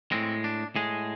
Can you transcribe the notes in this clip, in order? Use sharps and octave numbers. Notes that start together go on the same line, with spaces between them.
A2 G#3 C4
D4
A2 G#3 G#4